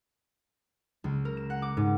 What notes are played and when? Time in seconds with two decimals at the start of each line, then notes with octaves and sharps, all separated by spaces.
1.04 C#2
1.25 A#4
1.37 E7
1.50 F#5
1.62 D6
1.77 G#2